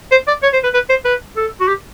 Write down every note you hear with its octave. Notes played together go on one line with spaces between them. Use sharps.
C5
D5
C#5
C5
B4
B4
C5
B4
A4
F#4
G4